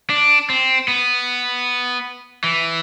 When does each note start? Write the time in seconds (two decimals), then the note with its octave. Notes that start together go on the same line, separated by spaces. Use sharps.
0.10 D4
0.50 C4
0.88 B3
2.44 E3